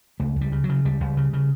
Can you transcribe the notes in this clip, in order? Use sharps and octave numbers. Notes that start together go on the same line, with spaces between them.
C#2 A3
C#2
G3
C#3
F#3
C#3
C#2 G3
C#2
C#3
C#3